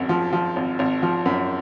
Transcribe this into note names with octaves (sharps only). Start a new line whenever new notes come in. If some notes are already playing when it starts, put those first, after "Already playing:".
Already playing: G#1 F#2
F3
F3
G#1
G#1
F3
F#2